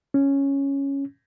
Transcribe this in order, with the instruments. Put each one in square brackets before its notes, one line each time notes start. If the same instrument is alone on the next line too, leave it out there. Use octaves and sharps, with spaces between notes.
[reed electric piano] C#4